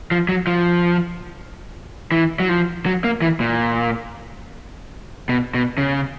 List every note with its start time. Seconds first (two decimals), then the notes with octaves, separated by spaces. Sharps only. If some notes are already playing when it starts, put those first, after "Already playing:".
0.11 F3
0.29 F#3
0.47 F3
2.12 E3
2.40 F#3
2.49 F3
2.86 F#3
3.04 A#3
3.22 E3
3.40 A#2
5.29 B2
5.54 B2
5.78 C#3